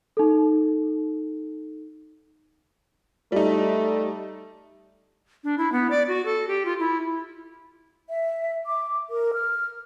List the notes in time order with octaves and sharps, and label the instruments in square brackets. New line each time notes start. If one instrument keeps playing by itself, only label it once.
[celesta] D#4 A4
[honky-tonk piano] G3 D#4 [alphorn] A3
[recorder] D4
E4
B3
D5
F#4
A4
G4
F4
E4
[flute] E5
D6
A#4
F6